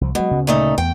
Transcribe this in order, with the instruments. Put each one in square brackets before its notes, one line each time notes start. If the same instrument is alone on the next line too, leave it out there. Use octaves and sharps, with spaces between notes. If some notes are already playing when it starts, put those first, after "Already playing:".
[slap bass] C2 F3
[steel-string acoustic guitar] B2 [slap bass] F#3 G#3
[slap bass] D2 C#3
[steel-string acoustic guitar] A#2 A3 D#4
[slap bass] E2 B3 [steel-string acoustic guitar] G5